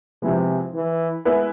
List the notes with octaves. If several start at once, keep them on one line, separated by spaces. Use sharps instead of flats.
C3 F3 G#3 B3 E4
E3
G#3 B3 E4 B4